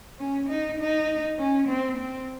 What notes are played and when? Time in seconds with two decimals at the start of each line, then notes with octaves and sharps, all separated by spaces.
0.19 C#4
0.49 D#4
0.80 D#4
1.38 C#4
1.68 C4
1.97 C4